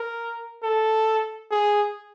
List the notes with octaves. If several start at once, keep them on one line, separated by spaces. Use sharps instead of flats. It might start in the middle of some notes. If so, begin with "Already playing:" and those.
Already playing: A#4
A4
G#4